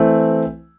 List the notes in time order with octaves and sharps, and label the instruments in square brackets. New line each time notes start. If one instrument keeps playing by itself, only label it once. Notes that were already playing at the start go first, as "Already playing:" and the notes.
Already playing: [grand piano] E3 A3 C4